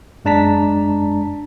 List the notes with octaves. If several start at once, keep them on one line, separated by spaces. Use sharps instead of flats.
F#2 G#3 D4 A5 A#5 B6